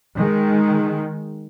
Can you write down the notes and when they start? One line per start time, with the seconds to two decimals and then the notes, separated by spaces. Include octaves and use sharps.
0.15 D#3 G#3